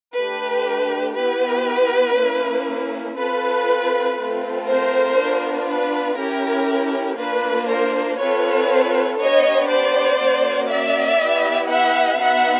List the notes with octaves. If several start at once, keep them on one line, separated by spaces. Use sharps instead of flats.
A3 D4 G4 B4
B3 E4 G4 B4
A#3 C#4 E4
C4 F4 A4 B4
A3 C4 F4 A4
A#4 C5
B3 D4 F4
B4
C#4 E4 G4 A#4
A#3 D4 F4 B4
A#4 C5
C4 F4 A4 B4 C#5
B3 D4 G4 C#5 D#5
C5 D5
A#3 C#4 F#4
D5 E5
B3 E4 G4
E5 F#5
B3 D#4 F#4 E5 F#5